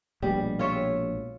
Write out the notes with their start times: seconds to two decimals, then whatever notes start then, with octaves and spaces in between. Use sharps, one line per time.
0.22 A#1 B2 G3 G#3
0.59 F4 C#5 E5